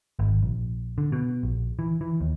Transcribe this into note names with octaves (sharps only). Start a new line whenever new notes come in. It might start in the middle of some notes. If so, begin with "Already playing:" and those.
G#1
A#1
D3
B2
A#1
E3
E3
D#2